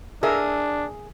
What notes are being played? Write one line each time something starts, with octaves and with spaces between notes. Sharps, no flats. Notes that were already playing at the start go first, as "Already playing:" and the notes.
D4 G#4 A#4 E5